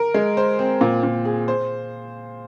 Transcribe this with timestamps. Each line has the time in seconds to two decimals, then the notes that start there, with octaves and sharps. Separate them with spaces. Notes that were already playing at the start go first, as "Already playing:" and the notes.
Already playing: A#4
0.14 G#3
0.37 C5
0.59 C4
0.81 A#2
1.03 A#2
1.25 G#4
1.48 C5